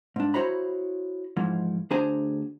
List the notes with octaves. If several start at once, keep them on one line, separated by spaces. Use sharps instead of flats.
G#2 D4
E4 F#4 C5 C#5 A#5 B5
G#2 E3 F3
D2 D4 G#4 C5 G#5 A#5